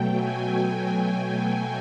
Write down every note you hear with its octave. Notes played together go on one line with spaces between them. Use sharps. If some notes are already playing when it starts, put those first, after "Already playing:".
Already playing: B2 F#3 A3 G5
G#5
G5